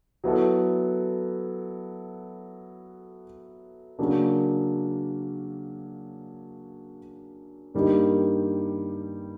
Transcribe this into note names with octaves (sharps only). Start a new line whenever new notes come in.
F#3 B3 E4 A4
C#3 F#3 A#3 D4
G2 D#3 G3 A#3